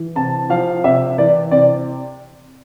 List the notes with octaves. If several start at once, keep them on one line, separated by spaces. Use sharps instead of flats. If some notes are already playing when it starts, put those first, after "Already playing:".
Already playing: E3
C3 A5
F3 F5
C3 E5
E3 D5
C3 D5